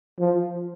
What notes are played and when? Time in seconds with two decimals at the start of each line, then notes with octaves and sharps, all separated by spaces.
0.19 F3